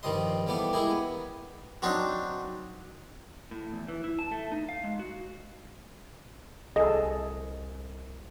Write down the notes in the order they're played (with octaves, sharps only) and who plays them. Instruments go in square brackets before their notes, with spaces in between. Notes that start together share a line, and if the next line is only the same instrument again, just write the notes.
[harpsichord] G2 D#3 F3 G3 D#5 C6
E2 G3 A3 B3 G4 F5
G#3 E4 G4 G#4 A#4
B3
F#3 C4 D4 D#4
[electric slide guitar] A2
E2
E3
E4
A5
A3
D#4
F5
G#3
F#4
[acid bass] C2 [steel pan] G#4 A4 [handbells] D#5